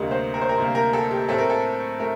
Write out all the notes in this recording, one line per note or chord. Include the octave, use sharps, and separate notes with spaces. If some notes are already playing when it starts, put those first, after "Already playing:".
Already playing: D2 C3 G3 A#3 D#5
C5
A#4
C5
A#4
D2 C3 G3 A#3
A#4
A4
G4
A2 A3 C4 A4
A#4
A4
A2 A3 A#4